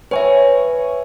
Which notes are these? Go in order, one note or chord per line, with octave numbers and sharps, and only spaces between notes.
B4 C#5 E5 G#5